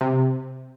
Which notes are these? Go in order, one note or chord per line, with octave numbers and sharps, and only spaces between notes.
C3